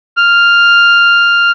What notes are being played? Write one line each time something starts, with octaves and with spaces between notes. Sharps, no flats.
F6